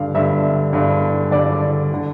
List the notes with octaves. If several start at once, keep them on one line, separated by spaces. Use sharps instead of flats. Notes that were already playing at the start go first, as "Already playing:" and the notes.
Already playing: G2 D3 F5
G2 D3 E5
G2 D3
G2 D3 D5
D3